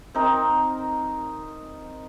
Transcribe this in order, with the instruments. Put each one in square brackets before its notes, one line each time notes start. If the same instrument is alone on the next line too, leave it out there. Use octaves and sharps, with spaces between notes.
[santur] C4 D#4 A#4